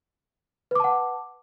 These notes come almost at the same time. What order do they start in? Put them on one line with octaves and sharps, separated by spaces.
B4 D6 A5 F#5